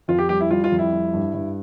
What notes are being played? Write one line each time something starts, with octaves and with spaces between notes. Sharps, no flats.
F2 F4
G4
G3 G4
E4
G3 F4
F4
F2
E4
G3
G2
G2